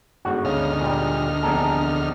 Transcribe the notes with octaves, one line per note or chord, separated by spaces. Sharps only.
G1 G#2 F#4
D2 C#3 D#4 F6
A#2 G3
A#1 E2 C3 A4 A#4 G#5